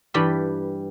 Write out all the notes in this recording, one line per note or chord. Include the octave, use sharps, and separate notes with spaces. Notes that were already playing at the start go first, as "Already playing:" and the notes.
G2 E3 G3 G4 B5